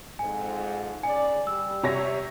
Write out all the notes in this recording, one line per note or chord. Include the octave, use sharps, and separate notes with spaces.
F2 G#2 G#5
C#3 D5 G#5
G3 E6
C3 C#5 A#6